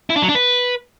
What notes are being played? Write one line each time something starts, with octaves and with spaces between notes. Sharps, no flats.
E4
D4
F#3
D4
B4